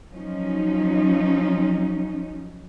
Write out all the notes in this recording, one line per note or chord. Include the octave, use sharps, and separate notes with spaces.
F3 F#3 C#4 D#4